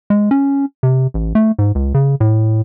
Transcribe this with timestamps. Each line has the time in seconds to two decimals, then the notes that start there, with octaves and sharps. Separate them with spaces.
0.10 G#3
0.31 C#4
0.83 C3
1.14 A1
1.35 A3
1.59 G#2
1.75 C#2
1.94 C#3
2.20 A2